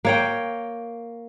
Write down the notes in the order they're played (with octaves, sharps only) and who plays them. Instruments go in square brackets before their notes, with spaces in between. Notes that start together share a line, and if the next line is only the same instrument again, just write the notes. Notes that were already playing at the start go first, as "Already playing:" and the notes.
[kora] A#3 C#5 G5